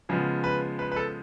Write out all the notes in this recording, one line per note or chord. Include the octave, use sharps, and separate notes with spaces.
C#3 F3 G#3 B3
B4
B4
B4
A4